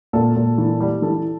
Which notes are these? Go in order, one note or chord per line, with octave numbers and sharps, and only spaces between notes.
A#2 A4
A#2
E3
G3
E3 A4